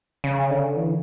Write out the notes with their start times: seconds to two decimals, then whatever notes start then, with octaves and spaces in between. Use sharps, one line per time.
0.24 C#3
0.50 D3
0.77 E3